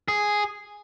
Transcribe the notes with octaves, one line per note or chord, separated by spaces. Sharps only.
G#4